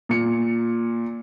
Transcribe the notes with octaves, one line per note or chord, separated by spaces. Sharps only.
A#2 C#7